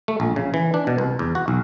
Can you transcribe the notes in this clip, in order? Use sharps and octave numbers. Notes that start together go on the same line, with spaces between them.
A3
A#1
C#3
E3
D4
B2
C2
E2
F#4
B1